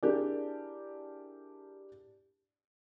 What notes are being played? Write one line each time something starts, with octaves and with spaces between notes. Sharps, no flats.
D4 E4 G4 G#4 A#4 D5